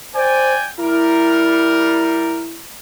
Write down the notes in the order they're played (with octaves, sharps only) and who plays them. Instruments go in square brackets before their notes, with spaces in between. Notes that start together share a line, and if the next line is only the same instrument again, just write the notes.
[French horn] C5 [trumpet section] D5 G5 G#5
[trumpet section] G3 A#4 [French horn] E4